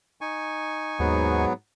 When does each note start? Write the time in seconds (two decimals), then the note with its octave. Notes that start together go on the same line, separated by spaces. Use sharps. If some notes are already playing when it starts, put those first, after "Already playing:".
0.21 D#4 G#5 C#6
0.99 D#2 G#2 F#3 B3